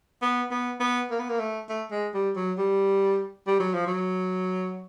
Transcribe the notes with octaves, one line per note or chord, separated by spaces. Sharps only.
B3
B3
B3
A#3
B3
A#3
A3
A3
G#3
G3
F#3
G3
G3
F#3
F3
F#3